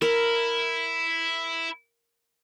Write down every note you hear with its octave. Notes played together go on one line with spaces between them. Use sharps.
E4 A#4